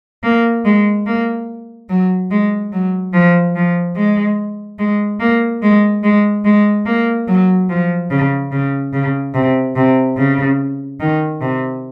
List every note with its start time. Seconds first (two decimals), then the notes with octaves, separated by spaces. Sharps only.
0.23 A#3
0.65 G#3
1.07 A#3
1.89 F#3
2.31 G#3
2.72 F#3
3.13 F3
3.56 F3
3.96 G#3
4.79 G#3
5.20 A#3
5.62 G#3
6.04 G#3
6.45 G#3
6.86 A#3
7.28 F#3
7.69 F3
8.11 C#3
8.52 C#3
8.93 C#3
9.34 C3
9.76 C3
10.17 C#3
11.00 D#3
11.41 C3